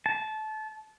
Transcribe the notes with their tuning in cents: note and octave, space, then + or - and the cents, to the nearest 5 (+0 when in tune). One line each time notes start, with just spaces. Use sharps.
A5 -25